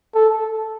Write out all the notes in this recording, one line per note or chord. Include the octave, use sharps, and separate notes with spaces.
A4